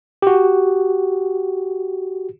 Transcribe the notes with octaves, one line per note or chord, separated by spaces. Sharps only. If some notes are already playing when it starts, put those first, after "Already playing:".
F#4 G4